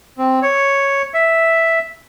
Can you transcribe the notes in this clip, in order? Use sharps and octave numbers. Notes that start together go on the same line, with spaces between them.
C4
C#5
E5